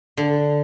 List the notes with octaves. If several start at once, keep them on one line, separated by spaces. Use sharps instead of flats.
D3